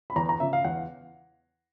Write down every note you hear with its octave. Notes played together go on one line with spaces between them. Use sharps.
B5
E2 A#5
A#5
C#3 F3 E5
F5
E2 F#5